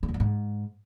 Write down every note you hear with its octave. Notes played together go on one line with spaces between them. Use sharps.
C#3
E2
F#2
G#2